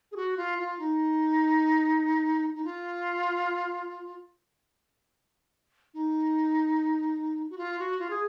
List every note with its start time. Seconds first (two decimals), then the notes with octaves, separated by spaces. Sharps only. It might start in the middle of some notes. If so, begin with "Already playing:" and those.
0.12 G#4
0.16 F#4
0.37 F4
0.58 F4
0.79 D#4
2.55 D#4
2.64 F4
5.94 D#4
7.50 F#4
7.58 F4
7.79 F#4
7.99 F4
8.10 G#4